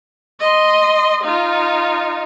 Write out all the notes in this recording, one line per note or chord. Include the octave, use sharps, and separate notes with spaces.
D#5 C6
D#4 F4